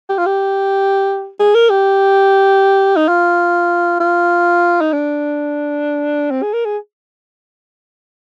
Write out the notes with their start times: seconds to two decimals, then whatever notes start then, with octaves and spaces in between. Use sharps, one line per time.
0.09 G4
0.18 F4
0.26 G4
1.40 G#4
1.55 A#4
1.70 G4
2.97 D#4
3.08 F4
4.00 F4
4.81 D#4
4.93 D4
6.31 C4
6.43 G#4
6.53 A#4
6.65 G#4